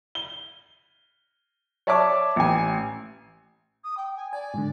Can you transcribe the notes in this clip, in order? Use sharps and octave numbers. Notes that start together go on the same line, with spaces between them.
G7
C#5 D5 E5 A5 C#6 D6
A1 G#5
D#6
G5
G#5
D5 G#5
G#2 D3